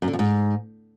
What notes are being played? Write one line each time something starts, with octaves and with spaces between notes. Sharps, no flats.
F#2
D3
F2
G#2